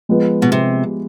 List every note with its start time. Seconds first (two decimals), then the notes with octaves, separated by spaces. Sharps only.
0.09 F3 G#3 B3
0.42 B2
0.52 C3